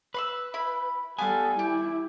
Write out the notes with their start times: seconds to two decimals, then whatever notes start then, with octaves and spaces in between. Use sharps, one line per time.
0.14 B4 B5 C6 E6
0.54 E4 B5
1.19 G3 B3 F4 A4 G#5 F6
1.59 E4 G4